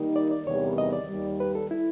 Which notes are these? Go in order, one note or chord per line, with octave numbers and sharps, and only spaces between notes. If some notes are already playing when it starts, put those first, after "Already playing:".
Already playing: D#3 G3 A#3 D#4
D5
D5
E2 C3 D#3 G3 B3 C#5
D#5
D5
D#2 D#3 G3
B4
A4
E4